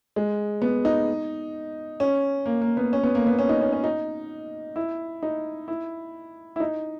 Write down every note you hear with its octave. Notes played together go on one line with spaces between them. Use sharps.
G#3
B3
D#4
C#4
A#3
A#3
B3
C#4
B3
A#3
B3
C#4
D#4
C#4
C#4
D#4
E4
D#4
E4
E4
D#4